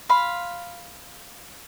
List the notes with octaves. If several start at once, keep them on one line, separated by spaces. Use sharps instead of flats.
F5 B5 C6